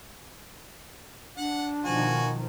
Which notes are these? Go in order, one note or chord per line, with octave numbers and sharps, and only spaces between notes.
D4 F#5
B2 D#3 F3 F#4 G#5